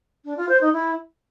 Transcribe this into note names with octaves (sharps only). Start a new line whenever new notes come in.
D4
F4
C5
D#4
E4